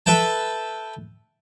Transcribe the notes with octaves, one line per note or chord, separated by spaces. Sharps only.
A4 B4 E5 G5 A5